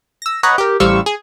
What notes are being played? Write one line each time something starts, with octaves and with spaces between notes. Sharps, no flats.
E6 A#6
B4 C#5 D#5 F#5 A#5
G4 A#4
A1 G3 C5 F5 C#6 E6
G#4